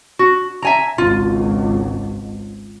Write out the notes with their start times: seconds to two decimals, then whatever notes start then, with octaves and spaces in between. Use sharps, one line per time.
0.19 F#4
0.62 E5 G#5 A#5
0.98 G#1 C#2 F4